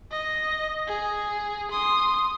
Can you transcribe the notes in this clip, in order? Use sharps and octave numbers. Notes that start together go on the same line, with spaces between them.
D#5
G#4
C6 D#6